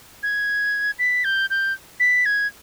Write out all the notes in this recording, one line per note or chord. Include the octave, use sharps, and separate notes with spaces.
G#6
B6
G6
G6
B6
G#6